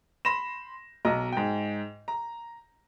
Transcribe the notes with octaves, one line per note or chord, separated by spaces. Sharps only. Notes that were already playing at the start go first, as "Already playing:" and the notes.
B5 C6 A#6 E7
B1 D#5 A#5
G#2 G5
A#5